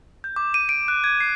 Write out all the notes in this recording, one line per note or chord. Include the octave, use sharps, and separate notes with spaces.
G6
D6
D#7
D7
F#6
G#6
C7